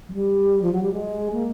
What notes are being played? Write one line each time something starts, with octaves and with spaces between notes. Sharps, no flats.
F#3
G3
F3
F#3
G3
G#3
A#3